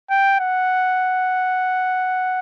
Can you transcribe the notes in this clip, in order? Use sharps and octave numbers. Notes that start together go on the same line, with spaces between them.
G5
F#5